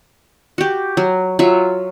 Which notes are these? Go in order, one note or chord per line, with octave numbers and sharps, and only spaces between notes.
F#4 G4
F#3
F#3 F4 E5